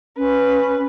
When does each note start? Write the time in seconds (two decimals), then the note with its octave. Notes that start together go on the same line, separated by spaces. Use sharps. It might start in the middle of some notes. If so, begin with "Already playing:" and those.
0.17 C#4 B4